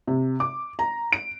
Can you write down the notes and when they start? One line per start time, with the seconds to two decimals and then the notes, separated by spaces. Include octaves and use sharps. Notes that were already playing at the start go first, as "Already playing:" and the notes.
0.07 C3
0.40 D6
0.79 A#5
1.13 D7